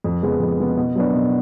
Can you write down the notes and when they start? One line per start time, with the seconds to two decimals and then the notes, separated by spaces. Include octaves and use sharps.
0.04 F2
0.22 C#3 F3 G#3 B3
0.40 F2
0.59 C#3 F3 G#3 B3
0.77 B2
0.96 F#3 B3 D4
1.14 B2